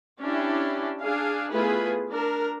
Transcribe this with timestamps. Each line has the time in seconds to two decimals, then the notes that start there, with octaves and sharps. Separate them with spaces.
0.21 C#4 D4 E4 G4
1.02 D4 G#4 F5
1.51 A3 B3 E4 F4 G#4 B4
2.10 D4 A#4